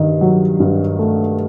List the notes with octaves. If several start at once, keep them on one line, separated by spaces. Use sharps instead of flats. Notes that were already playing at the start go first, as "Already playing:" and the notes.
Already playing: G2 D#3
F#3
G2
A3